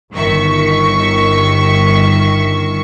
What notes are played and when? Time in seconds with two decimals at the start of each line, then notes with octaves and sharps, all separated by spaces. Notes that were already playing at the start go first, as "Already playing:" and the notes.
0.12 G1 D#3 E5 C#6